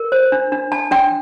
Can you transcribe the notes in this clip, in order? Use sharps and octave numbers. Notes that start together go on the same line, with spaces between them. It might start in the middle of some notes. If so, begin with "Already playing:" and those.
Already playing: A#4
C5
D4
D4
D4 A5
D4 G5